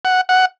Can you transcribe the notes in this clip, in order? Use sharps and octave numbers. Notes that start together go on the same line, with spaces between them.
F#5
F#5